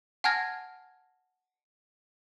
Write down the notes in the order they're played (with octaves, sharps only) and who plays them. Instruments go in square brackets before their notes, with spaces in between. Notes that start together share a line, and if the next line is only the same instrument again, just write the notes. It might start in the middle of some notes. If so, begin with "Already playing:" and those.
[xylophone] F#5 G#5 A5 F6 G#6 A#6